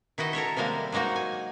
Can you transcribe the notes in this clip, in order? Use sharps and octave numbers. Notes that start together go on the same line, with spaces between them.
D#3 E4 F#4 D#5
A4 A#4 C#5 E5
C3 G3 G#3 A#3
F#3 G#3 A#3 D#4 F#4
G#5